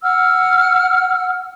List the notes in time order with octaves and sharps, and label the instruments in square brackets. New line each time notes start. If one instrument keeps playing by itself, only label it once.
[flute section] F#5 E6 F6